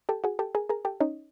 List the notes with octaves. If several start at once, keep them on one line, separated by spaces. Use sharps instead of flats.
G4 A4
F#4 G#4
G4 A4
G#4 A#4
G#4 A#4
G4 A4
C#4 D#4